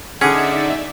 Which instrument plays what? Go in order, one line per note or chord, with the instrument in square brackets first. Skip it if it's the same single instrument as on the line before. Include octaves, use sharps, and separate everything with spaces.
[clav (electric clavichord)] D3 C#4 [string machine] D#4 D5 E5 [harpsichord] G#4 [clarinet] F#5